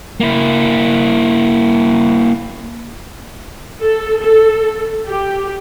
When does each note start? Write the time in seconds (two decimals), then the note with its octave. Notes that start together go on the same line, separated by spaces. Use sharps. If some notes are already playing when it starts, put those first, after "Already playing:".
0.20 A#3 E4
3.82 A4
4.20 A4
5.08 G4